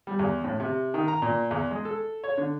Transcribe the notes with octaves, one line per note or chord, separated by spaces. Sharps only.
G3
E2
A2
C3
D#3
A#5
A#2
E2
G#3
A4
C#5
D3